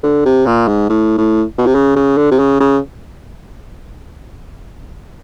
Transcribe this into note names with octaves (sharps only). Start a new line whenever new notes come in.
D3
C3
A#2
G#2
A2
A2
B2
C3
C#3
C#3
D3
C3
C#3
C#3